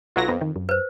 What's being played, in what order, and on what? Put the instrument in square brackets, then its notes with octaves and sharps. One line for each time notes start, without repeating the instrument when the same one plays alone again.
[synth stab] B1 F#3 A#6 [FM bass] F4
[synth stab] F2 [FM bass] B3
[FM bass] D#3
F#2
[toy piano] B4 C5